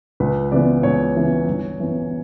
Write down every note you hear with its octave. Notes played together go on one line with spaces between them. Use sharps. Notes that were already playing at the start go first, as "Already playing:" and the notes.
C#2 B4
C#3 E3 B3 D5
C#2 C#5
C#3 E3 B3
G1
F#2 E3 B3